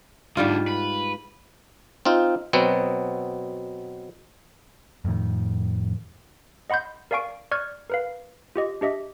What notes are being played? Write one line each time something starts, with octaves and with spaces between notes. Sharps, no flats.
D2 G#2 D3 G3 F4
B4
C4 D#4 F4
B2 F#3 B3 C4
F2 A2 D#3
D#5 F#5 B5 C6 G6
A#4 D5 F5 G#5 C#6 D7
D5 C#6 F6 F#6 G#6
A#4 B4 F5
F4 G4 D#5
D4 G4 D#5 E5